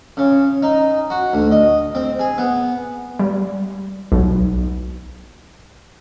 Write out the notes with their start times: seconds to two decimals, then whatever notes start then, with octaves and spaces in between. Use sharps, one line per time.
0.17 C#3
0.62 D#4
1.10 F#4
1.33 D2
1.51 D#5
1.95 C4
2.19 G#4
2.38 B3
3.19 G3
4.12 B1